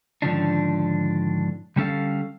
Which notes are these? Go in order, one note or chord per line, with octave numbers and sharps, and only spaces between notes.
G#2 D3 D#3 F3 C#4 D4
D3 G3 C#4 A4 F5